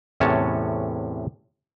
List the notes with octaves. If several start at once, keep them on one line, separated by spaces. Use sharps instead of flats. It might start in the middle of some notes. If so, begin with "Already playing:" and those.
E2 A2 C3 C#4 C#5 A5